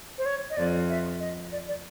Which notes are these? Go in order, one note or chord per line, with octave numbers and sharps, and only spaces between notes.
C5
C#5
D#5
F2 D5
E5
D#5
D5
D5